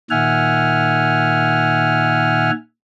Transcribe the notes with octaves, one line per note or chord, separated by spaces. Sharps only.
A#2 D#3 E5 F#5 G#5 F6